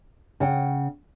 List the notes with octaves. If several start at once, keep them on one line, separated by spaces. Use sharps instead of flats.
C#3 F#5 G5